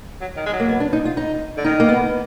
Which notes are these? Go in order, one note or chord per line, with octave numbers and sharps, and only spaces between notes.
F#3
D#3
G#3
F#3
A#3
B3
D4
D#4
F4
D#4
D3
D#3 D#4
A#3
B3